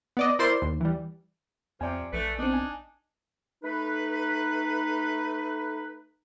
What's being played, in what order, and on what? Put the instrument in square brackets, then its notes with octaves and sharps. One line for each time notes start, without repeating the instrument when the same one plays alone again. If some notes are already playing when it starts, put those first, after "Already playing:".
[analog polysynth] B3 D5 D#5
E4 A#4 C5 D5 C6
D#2
E3 G3
[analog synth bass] F2 [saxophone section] C3 F3 [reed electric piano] D5 G#5
[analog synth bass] A#1 [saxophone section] A3 B4
[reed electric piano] B3 C4 [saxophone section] D4 D#4
[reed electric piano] G#5
[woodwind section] A3 D#4 B4